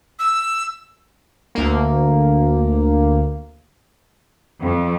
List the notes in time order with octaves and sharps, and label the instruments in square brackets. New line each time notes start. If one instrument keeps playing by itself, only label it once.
[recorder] E6
[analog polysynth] D2 A#3
[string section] F2